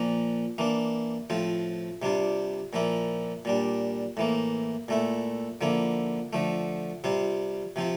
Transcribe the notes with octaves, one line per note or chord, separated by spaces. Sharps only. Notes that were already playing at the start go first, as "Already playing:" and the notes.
Already playing: A#2 F3 A#3
E3 A#3 D4
A2 F3 C4 F4
C3 G3 D4 F4
A#2 F3 A#3 E4
A#2 G3 D4
A2 E3 A#3
A#2 A3 E4
D3 F3 A#3 E4
D3 F3 A3
C3 G3 C4 F4
C3 F3 C4 F4